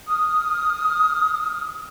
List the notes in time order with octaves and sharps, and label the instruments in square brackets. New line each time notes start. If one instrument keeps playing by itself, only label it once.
[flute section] D#6 F6